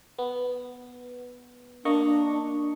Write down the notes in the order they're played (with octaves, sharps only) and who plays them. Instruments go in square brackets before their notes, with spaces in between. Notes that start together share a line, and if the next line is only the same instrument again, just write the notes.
[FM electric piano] B3
[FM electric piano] A#3 D#5 C#6 [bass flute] D4